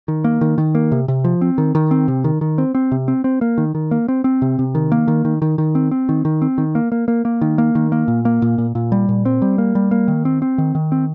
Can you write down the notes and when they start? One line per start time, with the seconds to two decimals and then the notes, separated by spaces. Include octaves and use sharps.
0.08 D#3
0.24 A#3
0.41 D#3
0.58 D#3
0.75 A#3
0.92 C3
1.08 C3
1.24 F3
1.41 C4
1.58 D#3
1.75 D#3
1.91 C4
2.08 C3
2.24 D#3
2.41 D#3
2.58 C4
2.75 C4
2.92 C3
3.08 C4
3.24 C4
3.41 A#3
3.58 D#3
3.75 D#3
3.91 A#3
4.08 C4
4.24 C4
4.42 C3
4.59 C3
4.75 D#3
4.92 A#3
5.08 D#3
5.25 D#3
5.42 D#3
5.58 D#3
5.75 C4
5.91 C4
6.09 D#3
6.25 D#3
6.42 C4
6.58 D#3
6.75 A#3
6.92 A#3
7.08 A#3
7.25 A#3
7.41 D#3
7.58 A#3
7.75 D#3
7.92 A#3
8.08 A#2
8.25 A#3
8.42 A#2
8.58 A#2
8.75 A#2
8.92 G3
9.09 A#2
9.25 C4
9.42 G3
9.58 A#3
9.75 G3
9.91 A#3
10.08 D#3
10.25 C4
10.42 C4
10.58 D#3
10.75 D#3
10.92 C4